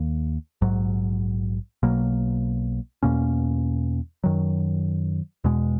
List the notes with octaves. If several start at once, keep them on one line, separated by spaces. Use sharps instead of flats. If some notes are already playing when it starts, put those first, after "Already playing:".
Already playing: D#2 D#3 A#3
A#1 G#2 F#3
B1 B2 F#3 A#3
E2 B2 A#3 C#4
F#2 D#3 F#3
E2 B2 G#3